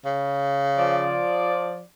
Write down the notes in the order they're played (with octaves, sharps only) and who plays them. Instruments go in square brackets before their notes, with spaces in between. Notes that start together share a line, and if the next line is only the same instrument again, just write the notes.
[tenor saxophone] C#3
[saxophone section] F3 D5